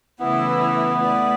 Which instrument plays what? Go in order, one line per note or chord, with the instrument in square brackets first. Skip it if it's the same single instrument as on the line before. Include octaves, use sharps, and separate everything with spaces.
[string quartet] C#3 E3 A3 E4 B4 [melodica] B3
[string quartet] A3 E4 B4 D5